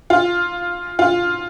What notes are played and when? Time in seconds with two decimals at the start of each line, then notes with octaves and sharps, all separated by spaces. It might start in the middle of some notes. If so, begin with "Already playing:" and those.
0.10 F4
0.99 F4